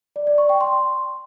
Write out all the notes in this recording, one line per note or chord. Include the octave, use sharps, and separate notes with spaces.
D5
D5
C#6
G5
C6